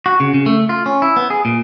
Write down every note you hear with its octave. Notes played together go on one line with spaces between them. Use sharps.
F#4
C#3
C#3
A3
F4
C#4
E4
B3
G#4
A#2